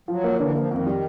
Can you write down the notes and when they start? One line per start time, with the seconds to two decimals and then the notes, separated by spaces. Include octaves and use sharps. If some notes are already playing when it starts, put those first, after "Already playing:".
0.08 F3 F#3
0.24 A#3
0.39 D3 E3
0.55 F3 A#3
0.71 F2 D#3
0.87 G3